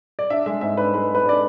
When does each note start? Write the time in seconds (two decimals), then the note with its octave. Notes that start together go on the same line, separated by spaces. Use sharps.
0.19 D5
0.30 D4 E5
0.46 G#3 E5
0.61 G#2 E5
0.77 D4 B4
0.94 G#3 B4
1.10 G#3
1.15 B4
1.25 D4 D5